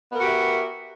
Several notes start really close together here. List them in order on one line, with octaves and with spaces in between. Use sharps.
B3 A#4 F#4 G4 E4